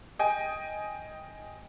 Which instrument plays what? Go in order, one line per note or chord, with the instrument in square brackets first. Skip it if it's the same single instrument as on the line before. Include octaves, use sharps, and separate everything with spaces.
[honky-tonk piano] D#5 G5 G#5